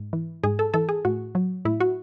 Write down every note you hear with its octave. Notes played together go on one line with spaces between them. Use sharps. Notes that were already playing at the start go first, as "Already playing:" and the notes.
Already playing: G#2
E3
G#2 G#4
A4
E3 A4
G#4
A2 F#4
F#3
A2 E4
F#4